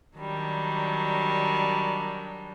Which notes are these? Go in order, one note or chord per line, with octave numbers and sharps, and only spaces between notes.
D#3 F#3 G3 D4